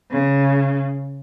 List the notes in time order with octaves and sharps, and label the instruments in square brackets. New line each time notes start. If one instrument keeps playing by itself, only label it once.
[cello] C#3